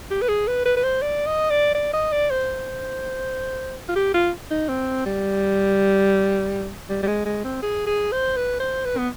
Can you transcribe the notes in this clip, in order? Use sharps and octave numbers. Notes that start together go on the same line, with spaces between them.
G4
B4
G#4
B4
B4
B4
C5
D5
D#5
D5
D5
D#5
D5
C5
F4
G4
F4
D#4
C4
G3
G3
G3
G#3
G#3
C4
G#4
G#4
C5
B4
C5
B4
B3